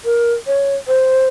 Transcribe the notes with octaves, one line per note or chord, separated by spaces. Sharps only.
A#4
C#5
C5